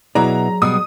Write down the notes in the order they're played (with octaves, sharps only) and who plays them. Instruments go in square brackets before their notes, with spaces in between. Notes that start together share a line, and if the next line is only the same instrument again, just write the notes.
[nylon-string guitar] B2 E4 B4 [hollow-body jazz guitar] F#3 G#4 D5 [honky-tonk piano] A#5
[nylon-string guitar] B2 G3 [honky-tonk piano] D#6